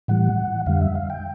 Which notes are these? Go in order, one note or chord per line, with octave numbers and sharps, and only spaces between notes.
A2 E3 G3 F#5
F2 D3 G3 F5
E5
F5
G5